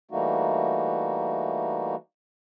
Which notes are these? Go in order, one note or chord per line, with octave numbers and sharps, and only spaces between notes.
E3 G3 A3 A#3 D#4 F#4